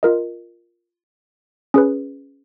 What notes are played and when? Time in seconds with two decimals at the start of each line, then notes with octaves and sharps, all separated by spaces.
0.03 F4 A#4 D#5
1.74 C#4 G#4 B4